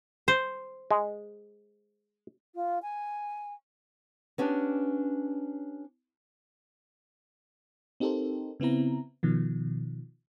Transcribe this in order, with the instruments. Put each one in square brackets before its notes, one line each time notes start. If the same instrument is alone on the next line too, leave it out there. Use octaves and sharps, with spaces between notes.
[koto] C5
[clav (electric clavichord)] G#3
[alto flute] F4
G#5
[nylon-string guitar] B3 C#4 D4 G4
[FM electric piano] C4 D#4 G4 A4 A#4 C5
C#3 B3 C4 E4 A#5
B2 D#3 F3